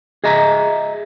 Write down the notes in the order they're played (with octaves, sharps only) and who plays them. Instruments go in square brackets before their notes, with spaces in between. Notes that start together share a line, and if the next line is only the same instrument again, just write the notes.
[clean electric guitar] G#4 D#5 E5 A#5